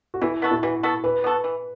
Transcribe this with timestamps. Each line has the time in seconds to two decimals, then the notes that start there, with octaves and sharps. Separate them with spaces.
0.14 F#4
0.21 E3 E4
0.42 B3 F#4 A4
0.51 E4
0.63 E3 F#4
0.83 B3 F#4 A4
1.04 E3 B4
1.24 B3 F#4 A4
1.44 E3